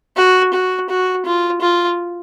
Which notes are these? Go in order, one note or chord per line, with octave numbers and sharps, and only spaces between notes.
F#4
F#4
F#4
F4
F4